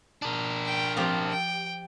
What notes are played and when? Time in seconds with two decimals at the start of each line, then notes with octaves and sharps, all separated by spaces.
0.22 D4 A#4
0.65 G5
0.97 F3 C4 F4 G4
1.30 G5